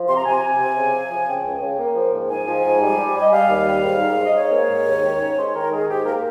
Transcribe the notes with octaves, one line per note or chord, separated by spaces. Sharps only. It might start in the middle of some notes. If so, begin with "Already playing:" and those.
Already playing: F3
C3 C6
A#5
C3 G#5
C3
C3
C#3
F3
F3
C#3 G5
C#2
C#3
A#3
F3
G#2
G#2 G#5
F3
G#2
G3
G3
G3
D#5
G3 F5
D#2
G3
G#2
G#2
G#2
D#5
G#2 C#5
A#3
G#2
D#2
D#3
C#4
G#3 C5
D#3 A#4
G#3 G#4
G#2 G4
A#3 A#4